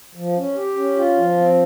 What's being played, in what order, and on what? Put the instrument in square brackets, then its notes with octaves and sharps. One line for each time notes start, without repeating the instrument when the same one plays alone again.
[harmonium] F3
C#4
G4
C#4
F4
F3
C4